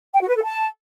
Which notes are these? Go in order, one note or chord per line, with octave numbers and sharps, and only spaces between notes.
G5
F#4
B4
A4
A5